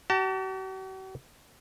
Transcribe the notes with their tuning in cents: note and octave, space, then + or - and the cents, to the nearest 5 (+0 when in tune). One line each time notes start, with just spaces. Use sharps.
F#4 +45 A5 +30